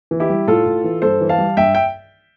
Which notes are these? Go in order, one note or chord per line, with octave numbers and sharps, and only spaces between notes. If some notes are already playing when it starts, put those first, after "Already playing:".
E3
E4 G4
G3
A2 F4 A4
A2
E3
G2 A4 C5
E3
F5 A5
G3
G2 E5 G5
G5